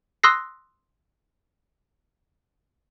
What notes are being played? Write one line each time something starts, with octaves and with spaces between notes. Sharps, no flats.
C6 D#6 E6 F#6 A#6 C7